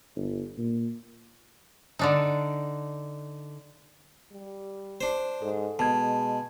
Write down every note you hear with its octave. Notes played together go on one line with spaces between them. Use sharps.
G1
A#2
D3 D4 D#4
G3
D4 C5
G#2 A4
B2 G#3 A5 G#6